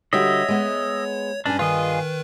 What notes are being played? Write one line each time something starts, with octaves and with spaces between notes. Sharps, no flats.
D3 G3 F#4 C#5 D#5 E5
G#3 B3
G2 C#4 D4 G#5
D#3 F4 G#4 B4 D#5